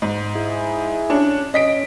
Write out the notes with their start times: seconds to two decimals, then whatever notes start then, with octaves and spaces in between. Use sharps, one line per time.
0.02 G#2
0.35 E4 G#4
1.10 C#4 D4
1.54 C#4 D#5 B6 D7